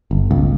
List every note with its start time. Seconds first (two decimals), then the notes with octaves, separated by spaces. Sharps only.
0.11 G1
0.31 C#2